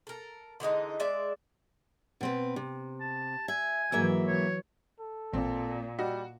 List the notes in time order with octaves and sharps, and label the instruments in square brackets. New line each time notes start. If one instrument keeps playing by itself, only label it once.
[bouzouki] A4 A#4
D3 E3 G#3 D#4
G#3 D5 E5
[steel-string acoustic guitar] B2 C4 B4
C3
[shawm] A5
[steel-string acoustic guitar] E5 [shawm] G#5
[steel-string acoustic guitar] G#2 A#3 E5 [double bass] E3 F#3
[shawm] C#5
[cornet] A4
[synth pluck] A1 [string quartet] A#2 [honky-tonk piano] C4
[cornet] G3 [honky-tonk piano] F#4 [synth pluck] D#5